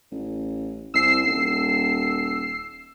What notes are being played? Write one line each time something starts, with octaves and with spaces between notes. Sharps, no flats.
A1
C2 E6 C7
D#1